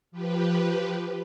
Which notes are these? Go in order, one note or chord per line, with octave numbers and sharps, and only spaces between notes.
F3 G4 B4